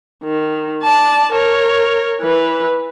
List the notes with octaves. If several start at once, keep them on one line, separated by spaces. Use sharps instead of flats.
D#3
D5 A5
A#4 C#5
E3 B4